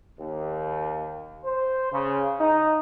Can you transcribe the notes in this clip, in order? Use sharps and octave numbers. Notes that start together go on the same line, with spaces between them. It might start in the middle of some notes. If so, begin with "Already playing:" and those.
D#2
C5
C#3
D#4